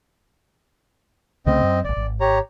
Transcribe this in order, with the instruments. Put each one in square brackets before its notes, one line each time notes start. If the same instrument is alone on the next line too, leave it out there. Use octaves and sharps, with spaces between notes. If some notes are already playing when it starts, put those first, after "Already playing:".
[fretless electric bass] C2 C#3 A3 [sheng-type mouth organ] C4 D#5
[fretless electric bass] F#2
[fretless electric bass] D#1 A1 [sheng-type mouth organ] D5
[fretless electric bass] G#1
[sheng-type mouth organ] G4 C#5 A#5